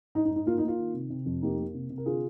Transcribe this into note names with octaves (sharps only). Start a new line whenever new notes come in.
G#2 D#4
D#4
G#2
D#4
A#3 F4
D#4
A#3
F4
D#3
C3
C3
F2
A#3 D#4 G4
A#3
C3
C3
A#4
D3 F4 G#4